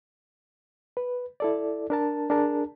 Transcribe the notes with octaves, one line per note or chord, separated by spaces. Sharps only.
B4
E4 A4 D5
D4 A#4 A5
D4 G#4 A#4 A5